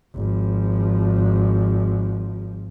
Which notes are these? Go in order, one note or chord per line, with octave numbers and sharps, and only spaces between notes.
G#1 F3